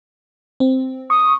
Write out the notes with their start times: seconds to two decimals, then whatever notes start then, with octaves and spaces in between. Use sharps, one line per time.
0.60 C4
1.10 C#6 D#6